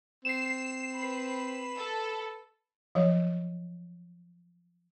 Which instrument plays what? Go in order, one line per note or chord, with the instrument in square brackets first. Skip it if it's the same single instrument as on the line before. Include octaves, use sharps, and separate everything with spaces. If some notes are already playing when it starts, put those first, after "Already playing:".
[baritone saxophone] C4 [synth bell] C7 E7
[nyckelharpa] B4 B5
[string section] A4
[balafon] F3 F#3 C#5